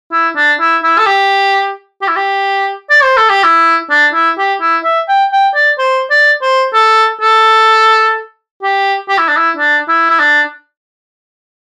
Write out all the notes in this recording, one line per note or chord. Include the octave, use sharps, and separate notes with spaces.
E4
D4
E4
E4
A4
G4
G4
E4
G4
D5
C5
A4
G4
E4
D4
E4
G4
E4
E5
G5
G5
D5
C5
D5
C5
A4
A4
G4
G4
E4
D4
E4
D4
E4
E4
D4